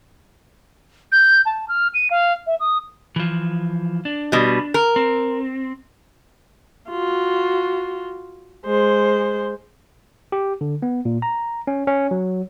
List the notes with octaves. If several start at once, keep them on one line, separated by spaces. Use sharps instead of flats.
G6
A5
F6
D#7
F5
E5
D#6
E3 F3
D4
B2 G3
A#4
C4
F4 F#4
G#3 C5
G4
D3
B3
A#2
A#5
C#4
C#4
F#3